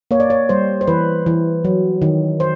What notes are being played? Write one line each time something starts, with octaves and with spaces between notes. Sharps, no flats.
A#3 C#5
D5
C#5
G3 C5
C5
E3 B4
E3
F#3
D#3
C5